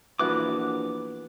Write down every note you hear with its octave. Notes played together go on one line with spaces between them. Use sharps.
A#1 E3 B3 F#4 D6 F#6